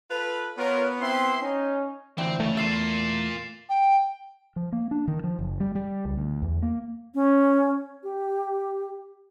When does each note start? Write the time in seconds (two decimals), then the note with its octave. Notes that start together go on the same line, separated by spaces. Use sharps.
0.11 F4 A4 B4
0.58 B3 F4 A#4 C#5
1.00 C4 E4 E5 C6
1.42 C#4 D#4
2.18 D2 E3 C4 G5
2.40 C#3 A3
2.57 E2 A#3 F4 E5 A6 C7 E7
3.69 G5
4.56 F3
4.72 A#3
4.91 D4
5.08 D#3
5.24 F3
5.39 F#1
5.60 G3
5.75 G3
6.05 C#2
6.17 D2
6.42 E2
6.62 A#3
7.14 C#4
8.03 G4